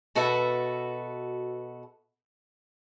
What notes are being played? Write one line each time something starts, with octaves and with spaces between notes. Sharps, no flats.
B2 F#4 A4 B4 E5 A5